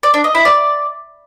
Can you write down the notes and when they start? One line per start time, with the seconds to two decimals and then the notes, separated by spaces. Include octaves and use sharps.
0.03 D5
0.14 D4
0.24 D#5
0.35 E4
0.45 D5